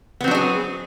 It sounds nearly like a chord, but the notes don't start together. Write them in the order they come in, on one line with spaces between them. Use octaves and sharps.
B3 C4 F#3 D4 G#4